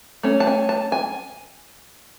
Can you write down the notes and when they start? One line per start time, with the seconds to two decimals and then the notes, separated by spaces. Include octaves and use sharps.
0.23 A3 C#4
0.40 A5
0.47 G#5
0.69 A5
0.92 G#5